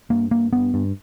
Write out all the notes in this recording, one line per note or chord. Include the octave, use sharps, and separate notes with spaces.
G2 A#3
G2 A#3
G2 B3
G2